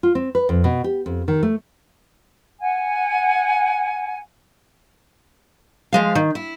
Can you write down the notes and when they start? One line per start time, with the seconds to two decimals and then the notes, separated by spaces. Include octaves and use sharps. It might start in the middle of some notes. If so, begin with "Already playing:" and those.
0.03 F4
0.15 C4
0.35 B4
0.49 F2
0.64 B2
0.84 G4
1.06 F2
1.28 D#3
1.43 A3
2.61 F#5 G#5
5.93 F3 G#3 F5
6.15 D#3
6.35 E4